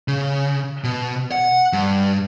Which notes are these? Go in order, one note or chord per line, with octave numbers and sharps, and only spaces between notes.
C#3
B2
F#5
G2